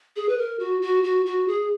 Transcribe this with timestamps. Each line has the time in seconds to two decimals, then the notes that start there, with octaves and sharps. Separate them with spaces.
0.16 G#4
0.29 B4
0.38 A#4
0.59 F#4
0.82 F#4
1.04 F#4
1.26 F#4
1.48 G#4